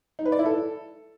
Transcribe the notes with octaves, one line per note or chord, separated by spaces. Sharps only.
D#4
B4
D5
E4
A4